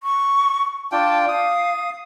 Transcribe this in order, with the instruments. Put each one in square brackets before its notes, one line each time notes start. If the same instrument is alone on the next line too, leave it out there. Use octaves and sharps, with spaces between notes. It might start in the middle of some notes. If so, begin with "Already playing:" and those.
[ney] C#6
[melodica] D4 F4 G5 [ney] A5
[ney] F5 [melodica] D#6